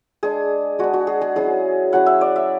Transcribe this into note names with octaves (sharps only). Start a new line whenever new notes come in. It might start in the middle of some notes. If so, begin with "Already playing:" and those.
G#3 D4 G#4
G#3 D4 F#4
F#4
G#4
G#4
F#3 C#4 E4 G#4
F#3 C#4 E4 F#5
E5
D5
E5